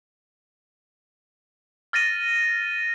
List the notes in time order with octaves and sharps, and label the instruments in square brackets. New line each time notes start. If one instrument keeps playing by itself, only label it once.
[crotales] F6 A6 A#6 D#7